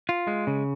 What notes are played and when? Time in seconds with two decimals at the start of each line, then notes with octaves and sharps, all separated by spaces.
0.09 F4
0.27 G#3
0.47 C#3